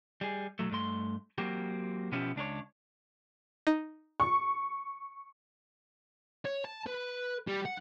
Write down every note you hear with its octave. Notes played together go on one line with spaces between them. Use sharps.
G3 G#4
B1 F#3 A3
G2 A3 C6
F#3 A#3 C4 F#4 G4
B2 F3 B3 C#4 E4 G4
C#2 D4 A#4 C#5
D#4
C#6
C#5
A5
B4
G3
F#5